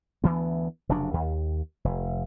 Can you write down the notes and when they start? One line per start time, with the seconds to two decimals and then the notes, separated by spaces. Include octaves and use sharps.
0.24 D2 E3 B3
0.89 F1 C#3 F#3 D4
1.14 D#2
1.85 F1